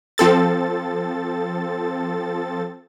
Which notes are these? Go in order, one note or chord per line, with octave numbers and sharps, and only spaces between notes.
F3 C4 A4 A6